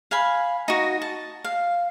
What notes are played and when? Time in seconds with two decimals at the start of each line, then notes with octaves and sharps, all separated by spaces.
0.11 F5 G#5 B5
0.68 D#4 F#4
1.02 A5
1.44 F5